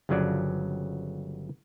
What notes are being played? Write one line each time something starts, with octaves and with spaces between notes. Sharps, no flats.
G1 C#3 F3 F#3 D4 D5